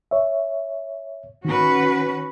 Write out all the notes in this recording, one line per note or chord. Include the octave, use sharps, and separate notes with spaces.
C#5 E5
D#3 C#4 F#4 B4